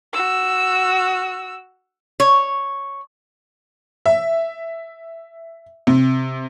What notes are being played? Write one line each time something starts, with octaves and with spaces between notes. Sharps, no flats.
F#4 E6
C#5
E5
C3